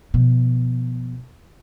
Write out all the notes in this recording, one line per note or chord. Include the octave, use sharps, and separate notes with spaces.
B2 F3